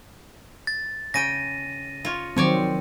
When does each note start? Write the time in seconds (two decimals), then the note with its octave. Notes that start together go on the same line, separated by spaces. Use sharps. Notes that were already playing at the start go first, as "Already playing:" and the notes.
0.67 A6
1.14 C#3 G5 A#6 D#7
2.05 F4 C#5
2.37 D#3 F3 F#3 C4 C#5 D5